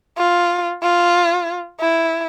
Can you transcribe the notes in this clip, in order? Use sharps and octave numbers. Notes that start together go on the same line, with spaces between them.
F4
F4
E4